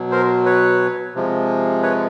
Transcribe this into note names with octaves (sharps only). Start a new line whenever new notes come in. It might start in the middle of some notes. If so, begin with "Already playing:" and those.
Already playing: B2 F#3
A#4 C5
B4 C#5
C3 F3 G#3
B4 C#5